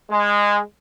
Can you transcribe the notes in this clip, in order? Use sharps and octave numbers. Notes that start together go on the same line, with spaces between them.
G#3